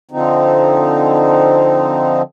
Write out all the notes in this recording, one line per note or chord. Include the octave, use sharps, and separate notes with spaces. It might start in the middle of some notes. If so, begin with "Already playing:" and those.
D3 F3 C4 D#4